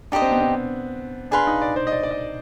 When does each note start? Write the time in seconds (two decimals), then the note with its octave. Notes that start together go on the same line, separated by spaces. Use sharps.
0.12 D4 D#4 G4 C5 D#5
0.22 C4
0.31 B3
0.41 C4
1.31 D4 G#4 B4 F5 C6
1.47 D#4
1.62 D5
1.76 C5
1.87 D#5
1.92 D5
2.03 D5
2.11 D#5